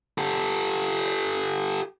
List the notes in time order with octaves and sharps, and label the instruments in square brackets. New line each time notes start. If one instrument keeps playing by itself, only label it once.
[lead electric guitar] G4 A4